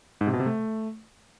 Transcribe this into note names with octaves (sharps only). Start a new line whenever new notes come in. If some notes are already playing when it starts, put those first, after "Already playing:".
G#2
C3
B2
C3
A3